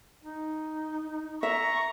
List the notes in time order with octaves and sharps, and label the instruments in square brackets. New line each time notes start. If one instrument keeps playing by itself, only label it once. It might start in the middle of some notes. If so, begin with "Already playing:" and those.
[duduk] D#4
[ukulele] E5 [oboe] A#5 [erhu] C#6